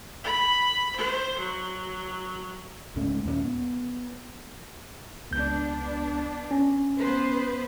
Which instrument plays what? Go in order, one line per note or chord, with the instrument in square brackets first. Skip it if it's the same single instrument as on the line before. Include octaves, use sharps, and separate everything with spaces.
[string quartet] B5
C5
F#3
[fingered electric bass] C#2 G#2 A3 C#4
D#2 A#2 A#3 C#4
B3
[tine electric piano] C#2 G6 [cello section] B3 D4
[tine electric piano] C#4
[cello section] B3 B4 C5